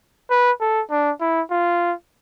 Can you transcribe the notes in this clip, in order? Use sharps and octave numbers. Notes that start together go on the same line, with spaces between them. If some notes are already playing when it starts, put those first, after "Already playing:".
B4
A4
D4
E4
F4